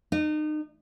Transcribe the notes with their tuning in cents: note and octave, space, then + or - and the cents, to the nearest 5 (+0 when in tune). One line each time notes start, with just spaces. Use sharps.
D#4 -35